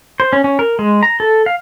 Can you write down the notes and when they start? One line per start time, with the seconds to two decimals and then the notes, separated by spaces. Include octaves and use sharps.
0.20 C5
0.33 C#4
0.44 C#4
0.59 A#4
0.79 G#3
1.03 A#5
1.20 A4
1.46 F5